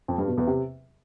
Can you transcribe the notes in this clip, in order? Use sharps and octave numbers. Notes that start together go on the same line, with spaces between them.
F2
G2
B2
E2
C3